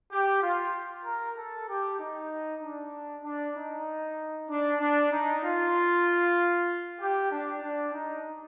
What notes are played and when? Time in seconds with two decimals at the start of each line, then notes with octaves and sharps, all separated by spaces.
0.12 G4
0.43 F4
1.06 A#4
1.38 A4
1.69 G4
2.00 D#4
2.63 D4
3.25 D4
3.57 D#4
4.50 D4
4.81 D4
5.13 D#4
5.44 F4
7.01 G4
7.32 D4
7.63 D4
7.94 D#4